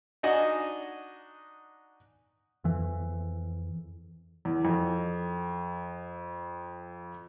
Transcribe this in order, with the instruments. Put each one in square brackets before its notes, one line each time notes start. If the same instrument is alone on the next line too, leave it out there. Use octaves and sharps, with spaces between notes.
[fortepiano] D4 D#4 F#4 D#5 F#5 G#5
[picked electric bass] F2 E3
[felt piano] E2
F2